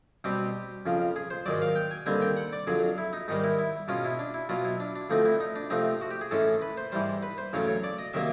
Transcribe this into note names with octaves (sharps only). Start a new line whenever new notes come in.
B2 G3 C4 G4
F2 C#3 F3
G#4
C5
G#2 D#3 F#3 D5
F5
G5
G#5
D#2 D3 G3 C4 G#5
G5
F#5
D5
F2 D3 F#3 G#4
E4
D#4
G#2 D#3 G3 D#4
E4
E4
B2 G#3 C#4 F4
E4
D4
E4
B2 F#3 B3 F4
E4
D4
D4
D2 D3 F3 A3 C4 D#4
E4
D#4
D4
C3 F3 A3 C4 D#4
F#4
G4
G#4
A2 E3 G#3 C#4 A4
B4
C5
G#2 E3 G3 C5
B4
C5
E2 C#3 F#3 A3 C#5
C#5
D5
D#5
C3 D#3 F#3 A#3 E5